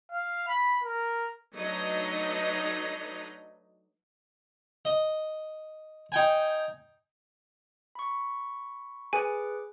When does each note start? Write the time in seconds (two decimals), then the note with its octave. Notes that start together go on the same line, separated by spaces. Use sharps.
0.12 F5
0.48 B5
0.84 A#4
1.55 F#3 A3 D4 D#4 B4 D#5
4.85 D#5
6.12 D#4 G5 G#5
7.95 B5 C#6
9.13 G#4 B4 G#5 D6